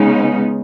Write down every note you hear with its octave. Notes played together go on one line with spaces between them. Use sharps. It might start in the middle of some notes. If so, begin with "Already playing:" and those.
Already playing: C#3 G#3 B3 D#4